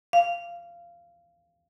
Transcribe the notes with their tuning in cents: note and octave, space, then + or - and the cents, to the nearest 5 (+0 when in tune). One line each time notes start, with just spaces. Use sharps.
F5 -15